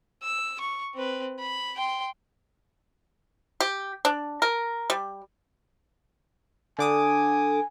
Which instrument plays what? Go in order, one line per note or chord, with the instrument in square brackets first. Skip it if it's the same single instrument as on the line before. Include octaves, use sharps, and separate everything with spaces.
[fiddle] E6
C#6
C4 B4
B5
G5 C6
[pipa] G4
D4
A#4
G3
[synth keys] D3 D6 D#6 [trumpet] G#5